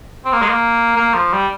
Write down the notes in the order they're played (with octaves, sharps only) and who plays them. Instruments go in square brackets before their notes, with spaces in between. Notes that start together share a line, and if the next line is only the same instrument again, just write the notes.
[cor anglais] C4
A#3
G#3
A#3
A#3
F3
G3